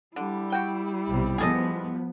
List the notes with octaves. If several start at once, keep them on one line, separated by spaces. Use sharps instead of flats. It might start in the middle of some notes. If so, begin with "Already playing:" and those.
D3 G3 E4
F#4 G5
B1 C3
F3 B3 G#4 A4 D#5